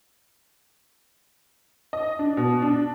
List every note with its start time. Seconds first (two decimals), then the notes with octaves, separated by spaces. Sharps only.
1.93 D#5
2.19 D4
2.37 B2
2.62 D4